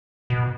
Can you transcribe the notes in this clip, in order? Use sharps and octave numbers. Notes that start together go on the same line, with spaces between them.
B2